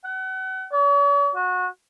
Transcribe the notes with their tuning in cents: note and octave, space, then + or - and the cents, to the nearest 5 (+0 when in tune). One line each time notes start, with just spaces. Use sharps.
F#5 +35
C#5 +45
F#4 -25